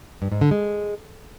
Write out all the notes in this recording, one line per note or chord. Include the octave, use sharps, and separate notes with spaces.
G2
G#2
D3
G#3